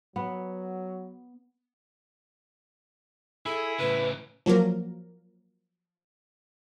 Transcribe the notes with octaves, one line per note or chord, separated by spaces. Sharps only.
F#3 B3
E4 G#4 A4
A2 C#3 B4
F3 F#3 A#3 A#4